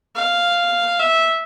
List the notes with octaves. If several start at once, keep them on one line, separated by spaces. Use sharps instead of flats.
F5
E5